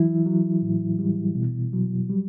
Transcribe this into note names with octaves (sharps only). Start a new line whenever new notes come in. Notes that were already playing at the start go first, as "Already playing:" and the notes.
Already playing: E3 F#3 E4
F#3
A2
G3
B2
F#3
G3